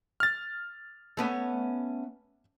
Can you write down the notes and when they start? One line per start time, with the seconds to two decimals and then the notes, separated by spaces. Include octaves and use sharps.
0.20 F6 A6
1.17 A3 B3 C#4